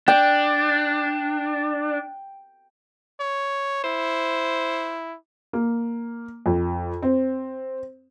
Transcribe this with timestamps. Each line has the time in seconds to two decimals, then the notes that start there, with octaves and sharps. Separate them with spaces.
0.08 D4 G5
3.20 C#5
3.84 E4 C5
5.53 A#3
6.46 F2
7.02 C4